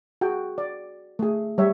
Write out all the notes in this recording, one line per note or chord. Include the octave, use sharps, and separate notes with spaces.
F#4 G#4 G5
D5
A3 G#4
G3 C#5 E5